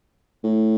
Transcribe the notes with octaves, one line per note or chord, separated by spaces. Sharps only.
A2